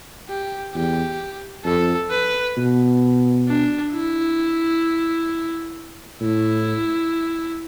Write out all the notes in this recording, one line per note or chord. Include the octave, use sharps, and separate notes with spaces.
G4
E2 G4
F2 A4
B4
B2
D4
E4
A2 E4